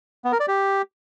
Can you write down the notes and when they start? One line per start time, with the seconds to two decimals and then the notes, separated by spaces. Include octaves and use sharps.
0.25 B3
0.32 A#4
0.40 D5
0.48 G4